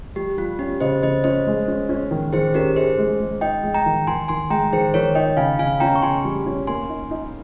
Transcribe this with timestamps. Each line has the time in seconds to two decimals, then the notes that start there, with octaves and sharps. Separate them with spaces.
0.16 G3 G4
0.37 G3 F4
0.59 C#4 G4
0.80 C#3 C5 D#5
1.02 C#3 C5 D#5
1.24 C#4 C5 D#5
1.47 G#3
1.68 C#4
1.89 C#4
2.11 D#3
2.33 D#3 G#4 C5
2.54 C#4 G4 A#4
2.76 D#4 G#4 C5
2.98 G#3
3.20 G#3
3.41 D#4 D#5 G5
3.63 G#3
3.74 G5 A#5
3.86 D#3
4.07 D#3 G#5 C6
4.28 D#3 G#5 C6
4.50 G#3 G5 A#5
4.72 D#3 G#4 C5
4.94 D#3 A#4 C#5
5.15 D#4 D#5 G5
5.37 C#3 F5 G#5
5.59 C#3 F5 G#5
5.80 C#4 G5 A#5
5.96 C#6
6.02 C#3 G#5 C6
6.25 G3
6.46 C#4
6.67 A#3 G#5 C6
6.89 D#4
7.11 D#4